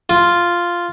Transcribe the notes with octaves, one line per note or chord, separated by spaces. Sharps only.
F4